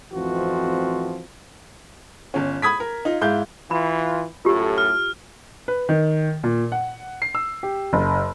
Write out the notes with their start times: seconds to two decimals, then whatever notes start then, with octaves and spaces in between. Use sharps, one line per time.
0.14 A1 F2 E3 F3 C4 F#4
2.34 G1 C#4
2.62 B5 D#6 G#6 B6
2.80 A#4
3.05 D#4 F4
3.21 G#2 E4 F5 G6
3.71 E3 F4 B5
4.45 F#2 A2 F4 G4 A4
4.78 F6
5.68 B4
5.89 D#3
6.44 A#2
6.72 F#5
7.22 C7
7.35 E6
7.63 G4
7.93 F#1